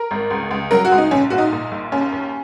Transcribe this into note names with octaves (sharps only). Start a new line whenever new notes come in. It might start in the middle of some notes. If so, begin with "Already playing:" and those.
Already playing: A#4
G#1
C#2
C#2
F#3 A#4
F#4
C#2
D#4
A#1 C#4
A#2 F#4
D#4
A#2
A#1
D#2 C#4
D#2